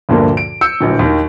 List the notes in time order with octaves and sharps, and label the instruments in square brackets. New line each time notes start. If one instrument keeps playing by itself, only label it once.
[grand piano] D2 G2 A#2 D3 F3 A#3
D7
E6 G6 C#7
D1 A#1
D#2 D#3